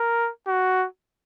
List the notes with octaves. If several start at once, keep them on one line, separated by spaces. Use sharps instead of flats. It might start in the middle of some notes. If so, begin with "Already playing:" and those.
Already playing: A#4
F#4